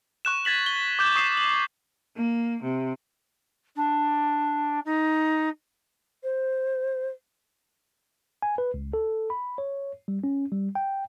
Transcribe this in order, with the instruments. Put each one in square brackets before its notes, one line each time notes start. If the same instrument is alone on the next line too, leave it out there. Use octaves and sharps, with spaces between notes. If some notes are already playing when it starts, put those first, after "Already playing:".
[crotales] C#6 F#6 E7
G#6 A6 B6 F#7
G7
D6 G6 E7
C#6 D#6 C7 E7
F#7
[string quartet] A#3
C3
[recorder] D4
D#4
[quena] C5
[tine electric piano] G#5
B4
C#2
A4
B5
C#5
G3
C#4
G3
G5